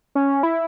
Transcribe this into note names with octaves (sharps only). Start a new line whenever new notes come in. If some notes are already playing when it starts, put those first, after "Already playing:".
C#4
E4